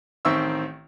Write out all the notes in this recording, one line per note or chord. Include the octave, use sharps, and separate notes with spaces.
A1 D#3 C4 E5 C#6 E6